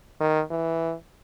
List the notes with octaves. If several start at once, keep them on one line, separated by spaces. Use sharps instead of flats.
D#3
E3